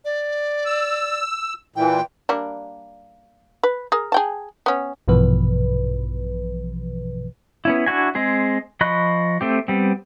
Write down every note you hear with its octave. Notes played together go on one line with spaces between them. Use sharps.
D5
E6
A#2 E3 G5
G3 A#3 D4
B4
G#4 A#4
G#4 G5 A5
B3 C#4
A#1 G2 B2 E3 F3 B4
B3 C#4 E4
D4 E4 F#4 G#5
G#3 C4 G#4
F3 D#5 B5 C#6 F#6
A3 C4 G4
G3 B3 C4